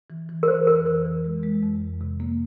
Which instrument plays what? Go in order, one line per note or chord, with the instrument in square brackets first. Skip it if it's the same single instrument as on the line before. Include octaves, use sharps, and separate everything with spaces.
[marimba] E3
E3
[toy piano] A#4
[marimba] E3 [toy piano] C5
[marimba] F2 [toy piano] A#4
[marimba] E3
E3
G#3
G#3
F2
G#3
C3
A#3